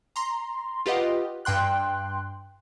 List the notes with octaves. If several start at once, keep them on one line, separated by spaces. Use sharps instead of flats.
A#5 C6
F4 G4 B4 D#5 F#5
G2 G5 C6 F#6